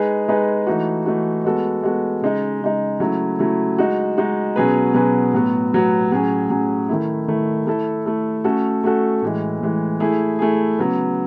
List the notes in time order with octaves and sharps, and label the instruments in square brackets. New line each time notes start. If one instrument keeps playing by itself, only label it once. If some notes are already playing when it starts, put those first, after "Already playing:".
Already playing: [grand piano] G#3 D#4 G#4 B4
G#3 D#4 G#4 B4
E3 A3 D#4 F#4
E3 A3 D#4 F#4
G#3 B3 F#4 A4
G#3 B3 F#4 A4
C#3 G#3 D#4
C#3 G#3 D#4
C#3 F#3 A3 E4
C#3 F#3 A3 E4
G#3 D#4 F#4
G#3 D#4 F#4
B2 F#3 C#4 G#4 B4
B2 F#3 C#4 G#4 B4
A2 F#3 B3 F#4
A2 F#3 B3 F#4
A2 F#3 C#4 G#4
A2 F#3 C#4 G#4
D#3 A3 E4
D#3 A3 E4
A3 E4 A4
A3 E4 A4
A3 C#4 F#4 A4
A3 C#4 F#4 A4
A2 E3 G#3
A2 E3 G#3
A3 E4 G#4
A3 E4 G#4
C#3 F#3 B3